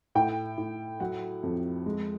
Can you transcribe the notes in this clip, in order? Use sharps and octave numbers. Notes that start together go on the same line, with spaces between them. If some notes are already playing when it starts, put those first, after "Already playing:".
A2 G5
A2
F#3 F#5
F2
G#3